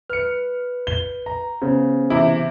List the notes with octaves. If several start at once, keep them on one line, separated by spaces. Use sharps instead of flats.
B4 F6 C#7
G7
A#5
C#3 B3 C5
C3 E3 E4